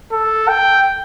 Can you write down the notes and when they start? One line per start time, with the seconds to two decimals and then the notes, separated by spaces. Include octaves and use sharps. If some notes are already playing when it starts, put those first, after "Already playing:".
0.12 A4
0.48 G5